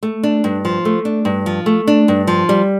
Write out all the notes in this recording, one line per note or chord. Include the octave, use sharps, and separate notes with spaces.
A3
D4
G2
F3
A3
D4
G2
F3
A3
D4
G2
F3
G3